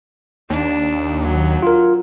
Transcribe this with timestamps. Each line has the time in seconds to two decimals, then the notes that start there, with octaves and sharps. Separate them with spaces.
0.50 D#2 D4
1.22 F#3
1.63 F4 A#4